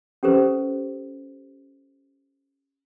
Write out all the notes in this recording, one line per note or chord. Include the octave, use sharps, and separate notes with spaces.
C#4 G4 A4 B4 C5